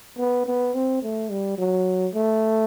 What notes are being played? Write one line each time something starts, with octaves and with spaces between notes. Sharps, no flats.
B3
B3
C4
A3
G3
F#3
A3